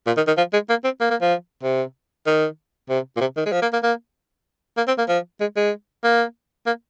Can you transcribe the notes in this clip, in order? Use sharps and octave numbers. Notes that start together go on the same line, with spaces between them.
A#2
D#3
D#3
F3
G#3
A#3
C4
A#3
A#3
F3
C3
D#3
C3
A#2
C3
D#3
G#3
F3
A#3
A#3
A#3
A#3
C4
A#3
F3
G#3
G#3
A#3
A#3